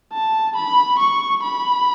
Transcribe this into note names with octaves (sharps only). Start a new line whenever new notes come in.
A5
B5
C#6
B5